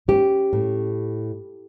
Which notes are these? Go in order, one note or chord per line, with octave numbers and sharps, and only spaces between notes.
C#4 G4
A2